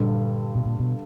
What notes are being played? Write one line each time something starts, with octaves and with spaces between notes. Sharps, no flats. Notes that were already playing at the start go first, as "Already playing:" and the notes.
Already playing: G2 A#2 D3 G3
B2
A#2
B2